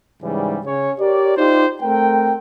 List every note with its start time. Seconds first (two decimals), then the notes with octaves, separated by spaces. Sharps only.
0.23 G#2 C#3 E3 G3
0.66 C#3 C#4 C#5
1.00 G4 A#4 C#5 D5
1.37 D#4 F4 G4 C5 D5
1.82 A3 C4 A#4 G5